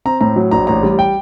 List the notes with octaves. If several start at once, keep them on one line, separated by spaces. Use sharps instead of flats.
C4 A#5
A2 A#5
F#3
A#1 A#5
A1 A#5
G3
G5